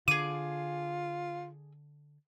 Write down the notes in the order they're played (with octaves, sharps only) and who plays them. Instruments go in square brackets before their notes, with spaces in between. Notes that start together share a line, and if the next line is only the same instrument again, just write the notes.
[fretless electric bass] D3 [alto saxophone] F4 [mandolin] G#4 D6 [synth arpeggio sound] D#7